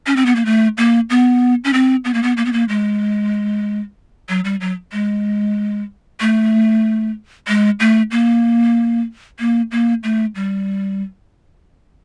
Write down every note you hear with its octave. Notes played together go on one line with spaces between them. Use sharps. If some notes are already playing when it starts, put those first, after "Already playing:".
C#4
C4
B3
A#3
A3
A#3
B3
C#4
C4
B3
A#3
B3
A#3
B3
A#3
G#3
F#3
G3
F#3
G#3
A3
G#3
A3
A#3
A#3
A#3
A3
G3